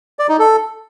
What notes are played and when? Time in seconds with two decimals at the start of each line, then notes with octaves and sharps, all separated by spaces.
0.19 D5
0.29 D#4
0.39 A4